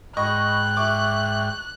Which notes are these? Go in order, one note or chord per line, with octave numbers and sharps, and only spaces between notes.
G#2 D#5 G5 B5 C#6 F#6
E5 C#6 D6